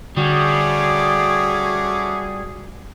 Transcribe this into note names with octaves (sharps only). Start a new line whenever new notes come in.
D3 G3 A3 C#4 F#4 G#4 D6